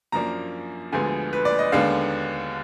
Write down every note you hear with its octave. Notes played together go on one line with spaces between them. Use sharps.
F#2 F3 A#3 D4 A#5
D2 D3 F3 G#3 B3 G#5
B4
D5
D#5
D#2 D3 G#3 B3 D4 F5